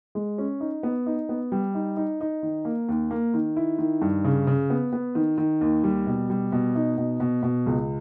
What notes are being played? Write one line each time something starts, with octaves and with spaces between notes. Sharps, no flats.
G#3
C#4
D#4
B3
D#4
B3
G3
D#4
D#4
D#4
D#3
A#3
D#2
A#3
D#3
E4
D#3
G2
C#3
C#3
B3
B3
D#3
D#3
D#2
G3
B2
G3
B2
D#4
B2
B2
B2
C#2